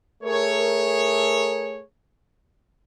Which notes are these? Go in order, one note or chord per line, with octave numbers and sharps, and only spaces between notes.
A3 G#4 A#4 C#5